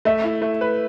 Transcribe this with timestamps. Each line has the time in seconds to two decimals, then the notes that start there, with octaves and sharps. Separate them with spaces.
0.05 A3 E5
0.24 E4
0.42 A3
0.61 B4